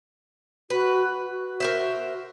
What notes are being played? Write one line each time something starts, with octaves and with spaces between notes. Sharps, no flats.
F#4 B4
F#4
A#4 C5 E5